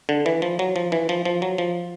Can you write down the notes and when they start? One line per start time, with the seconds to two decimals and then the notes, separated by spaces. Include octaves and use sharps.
0.09 D3
0.26 E3
0.42 F3
0.59 F#3
0.76 F3
0.92 E3
1.09 F3
1.25 F3
1.42 F#3
1.58 F3